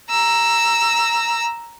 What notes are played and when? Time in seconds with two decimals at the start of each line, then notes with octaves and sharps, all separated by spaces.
0.10 A#5 E6